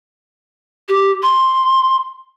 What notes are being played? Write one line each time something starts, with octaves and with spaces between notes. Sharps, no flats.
G4
C6